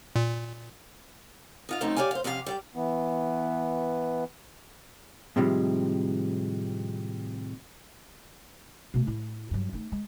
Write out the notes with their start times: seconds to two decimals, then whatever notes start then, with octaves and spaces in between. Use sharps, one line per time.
0.16 A#2
1.69 D#4 F4 F5
1.81 F#2 F3 A3 C4 D#4
1.97 G4 C#5 D5 F5 G#5
2.11 C5 F5
2.24 F2 C3 C#4 E4 F5
2.46 G3 D5 G5
2.75 E3 B3
5.36 A2 C3 D#3 F3 G3 G#3
8.94 B2 A3
9.07 A2 E4
9.51 G2 F#3
9.73 A3 D#4
9.92 G#3